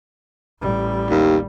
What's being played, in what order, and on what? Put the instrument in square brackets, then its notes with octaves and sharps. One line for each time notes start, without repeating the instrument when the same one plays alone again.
[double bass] A1 G3
[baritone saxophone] D#2